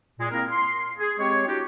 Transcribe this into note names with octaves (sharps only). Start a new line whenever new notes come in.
A#2 G#3
A#3 C4 E4 A#4
C6
G#4
G#3 C4 G4 C#5
D4 E4 F#4 G4